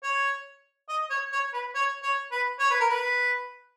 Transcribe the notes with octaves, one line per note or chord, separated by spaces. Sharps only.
C#5
D#5
C#5
C#5
B4
C#5
C#5
B4
C#5
B4
A#4
B4